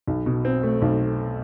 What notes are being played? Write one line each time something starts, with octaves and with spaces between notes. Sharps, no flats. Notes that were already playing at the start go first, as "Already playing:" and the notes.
B1
B2
C4
A3
B1